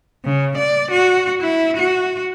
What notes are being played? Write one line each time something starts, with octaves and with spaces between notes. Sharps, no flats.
C#3
D5
F#4
E4
F#4